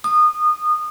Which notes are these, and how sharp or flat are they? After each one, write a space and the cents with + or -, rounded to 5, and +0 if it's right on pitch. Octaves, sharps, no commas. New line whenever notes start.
D#6 -25